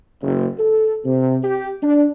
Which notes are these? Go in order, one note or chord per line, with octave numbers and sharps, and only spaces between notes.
F#1
A4
C3
G4
D4